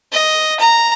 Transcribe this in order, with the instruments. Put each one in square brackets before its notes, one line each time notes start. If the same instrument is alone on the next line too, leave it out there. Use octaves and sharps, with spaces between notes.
[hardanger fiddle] D#5
A#5